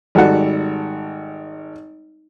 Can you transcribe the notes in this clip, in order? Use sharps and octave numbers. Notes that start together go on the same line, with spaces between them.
G#1 G3 F#4 A4 F#5